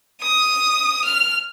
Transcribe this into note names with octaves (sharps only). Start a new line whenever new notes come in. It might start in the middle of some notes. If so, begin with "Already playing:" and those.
D#6
F6